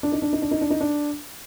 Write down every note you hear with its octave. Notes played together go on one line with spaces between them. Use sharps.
D4
D#4
D4
D#4
D4
D#4
D4
D#4
D4